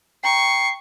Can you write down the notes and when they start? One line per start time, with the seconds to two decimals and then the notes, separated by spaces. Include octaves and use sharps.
0.24 G5 A#5 C#6 C7